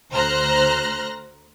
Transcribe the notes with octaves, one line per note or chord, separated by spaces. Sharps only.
D2 C5 A#5 F6 F#6 A#6